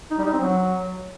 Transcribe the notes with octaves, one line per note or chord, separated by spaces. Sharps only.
D#4
G3
D#4
C4
F#3